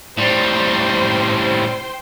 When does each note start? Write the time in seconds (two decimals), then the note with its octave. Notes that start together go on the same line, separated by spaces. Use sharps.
0.17 A2 G3 C5 G5 C6